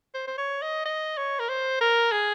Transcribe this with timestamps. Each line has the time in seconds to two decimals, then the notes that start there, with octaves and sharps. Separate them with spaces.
0.14 C5
0.27 C5
0.38 C#5
0.62 D#5
0.86 D#5
1.17 C#5
1.39 A#4
1.49 C5
1.81 A#4
2.12 G#4